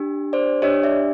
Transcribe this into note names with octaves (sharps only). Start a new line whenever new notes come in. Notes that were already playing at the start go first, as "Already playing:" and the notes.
Already playing: D4 G4
C5 D5
D4 G4 C#5 D#5
D5 E5